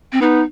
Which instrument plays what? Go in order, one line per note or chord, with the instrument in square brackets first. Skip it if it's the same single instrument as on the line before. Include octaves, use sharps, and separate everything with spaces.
[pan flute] C4
[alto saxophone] B3 [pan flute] D#4